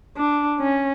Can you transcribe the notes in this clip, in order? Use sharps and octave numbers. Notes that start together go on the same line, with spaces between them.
D4
C#4